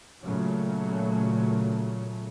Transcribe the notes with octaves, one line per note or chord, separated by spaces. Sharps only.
A#2 C#3 F#3 A3